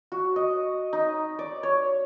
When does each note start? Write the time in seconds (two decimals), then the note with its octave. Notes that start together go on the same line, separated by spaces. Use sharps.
0.12 F#4
0.36 D#5
0.93 D#4
1.39 D5
1.63 C#5